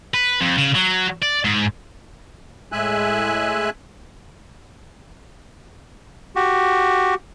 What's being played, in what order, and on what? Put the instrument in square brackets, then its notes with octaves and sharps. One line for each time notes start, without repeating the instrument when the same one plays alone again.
[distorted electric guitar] B4
F2
C#3
F#3
D5
G#2
[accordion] A2 G#3 E5 G#5 F#6
[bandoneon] F#4 G4